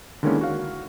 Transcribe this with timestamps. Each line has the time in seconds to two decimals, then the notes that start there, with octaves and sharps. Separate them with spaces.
0.23 D3 D#3 G#3 A#3 C#4 E4
0.41 F#4 F5